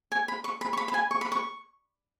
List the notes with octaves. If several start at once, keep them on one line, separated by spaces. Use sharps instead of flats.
G#5
B5
C#6
B5
C#6
B5
B5
G#5
C#6
B5
C#6